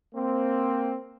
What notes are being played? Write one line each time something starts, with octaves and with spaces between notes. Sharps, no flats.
A#3 C4